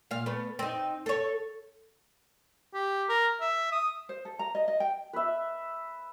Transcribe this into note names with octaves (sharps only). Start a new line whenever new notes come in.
A#2 F5
A3 B3
C4 D#4
A4 C#5
G4
A#4
E5
D#6
C5
A4
A#5
D#5
D#5
G5
B4 E5